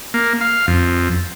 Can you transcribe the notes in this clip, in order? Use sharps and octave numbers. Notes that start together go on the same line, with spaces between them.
A#3
F5
F2